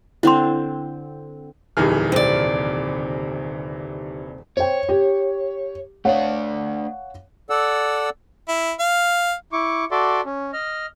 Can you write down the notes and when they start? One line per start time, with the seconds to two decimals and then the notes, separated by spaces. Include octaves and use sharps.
0.23 D3 C4 E4 C6
1.77 D#1 F2 D3 E3 D#4 G4 G#4 F6
2.12 C3 D5
4.57 C5 C#5 G5
4.89 G4
6.05 A3 D4 C#5 D5 F5 F#5
7.50 A4 D5 F#5 E6
8.48 E4
8.79 F5
9.52 E4 C#6 D6
9.91 F#4 A4 D5 E5 C6 D6
10.26 C#4
10.53 D#5 F6